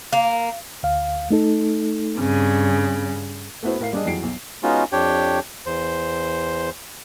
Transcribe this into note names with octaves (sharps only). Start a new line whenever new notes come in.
A#3
D2 F5
A3 D#4 A4
G2 C#3 C4
A3 B3 E4 F#4 C5
A2 A#4 F5 C7
G3 D4 G#4 D#5
F2 E3 F#3 G#4 C7 D7
B1
G#3 B3 C#4 D#4 F4 F#4
F2 D4 G4 C#5 G5
E2 C5